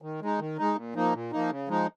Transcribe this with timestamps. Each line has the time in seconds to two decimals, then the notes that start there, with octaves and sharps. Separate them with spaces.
0.02 D#3
0.21 G#3 D#4
0.39 D#3
0.58 G#3 D#4
0.76 A#2
0.95 F3 A#3 D#4
1.13 A#2
1.32 F3 A#3 D#4
1.50 C#3
1.68 F3 G#3 D#4